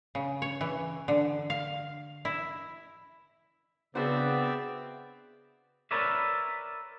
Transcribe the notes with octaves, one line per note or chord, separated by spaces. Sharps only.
C#3
C#5
E3
D3
F5
E4
C#3 B3 C4 D4 F#4 C5 D5 E5
A#4 B4 C#5 D5 E5